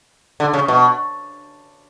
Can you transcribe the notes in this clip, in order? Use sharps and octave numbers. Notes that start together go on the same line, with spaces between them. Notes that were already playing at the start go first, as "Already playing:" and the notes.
D3
C#3
B2